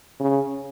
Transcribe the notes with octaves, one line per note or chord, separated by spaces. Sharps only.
C#3